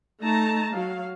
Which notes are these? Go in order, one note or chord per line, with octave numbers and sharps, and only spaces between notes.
A3 D#4 A5 A#5
F#3 F5